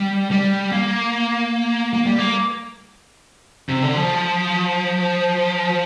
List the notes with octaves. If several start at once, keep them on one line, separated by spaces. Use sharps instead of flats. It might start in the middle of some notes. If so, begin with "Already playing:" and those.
Already playing: G3
G3
A#3
A#3
G3
A#3
C3
D3
F3